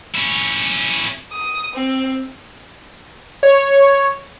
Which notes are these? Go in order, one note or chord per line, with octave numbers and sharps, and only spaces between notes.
C#4 E4
D#6
C4
C#5